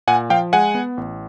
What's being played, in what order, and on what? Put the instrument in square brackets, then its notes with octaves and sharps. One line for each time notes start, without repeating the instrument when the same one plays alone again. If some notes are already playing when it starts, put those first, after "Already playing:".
[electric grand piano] A#2 F#5 G#5
F3 F5 G5
G#3 F#5 G#5
B3
A1